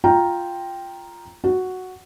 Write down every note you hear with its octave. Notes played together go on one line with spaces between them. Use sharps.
F4 G5 A#5
F#4